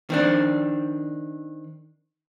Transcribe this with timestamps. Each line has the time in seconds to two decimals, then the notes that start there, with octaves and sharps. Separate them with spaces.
0.10 D#3 C4 D4